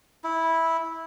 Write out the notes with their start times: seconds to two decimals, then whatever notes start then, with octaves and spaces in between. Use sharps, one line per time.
0.24 E4